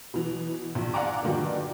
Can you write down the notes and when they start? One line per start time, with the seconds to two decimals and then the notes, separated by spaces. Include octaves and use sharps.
0.14 B2 E3 F#3
0.75 A#1
0.94 D5 F5 F#5 G#5 A#5 D6
1.23 G2 A#2 D3 D#3 F#3